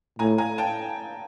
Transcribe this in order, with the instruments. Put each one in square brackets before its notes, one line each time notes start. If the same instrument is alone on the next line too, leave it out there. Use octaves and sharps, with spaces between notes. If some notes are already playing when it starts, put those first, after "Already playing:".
[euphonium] A2 [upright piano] G#5 A#5
[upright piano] G#5 A#5
G5 A5